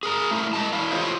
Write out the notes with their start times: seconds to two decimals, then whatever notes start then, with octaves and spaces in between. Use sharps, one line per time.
0.03 G#4 A#4 A#5
0.31 A3 E4 A4 A#4
0.53 G#3 D#5 A5
0.73 E2 E4 F5
0.91 F4 G4 A4 C5 C#5 D#5